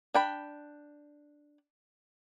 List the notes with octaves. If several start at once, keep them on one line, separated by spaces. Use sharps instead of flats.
D4 G5 B5